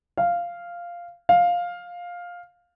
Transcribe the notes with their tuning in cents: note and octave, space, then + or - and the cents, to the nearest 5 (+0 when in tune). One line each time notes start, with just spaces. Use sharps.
F5 -5
F5 +10